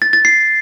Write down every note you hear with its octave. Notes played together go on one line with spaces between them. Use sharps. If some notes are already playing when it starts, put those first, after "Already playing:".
A6
A6
C7